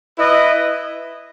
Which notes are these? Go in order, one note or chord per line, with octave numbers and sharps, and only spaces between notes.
E4 B4 D#5